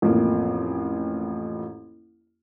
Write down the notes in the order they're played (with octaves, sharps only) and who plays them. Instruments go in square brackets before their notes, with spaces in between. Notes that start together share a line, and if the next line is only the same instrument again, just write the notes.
[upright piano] A1 F2 A#3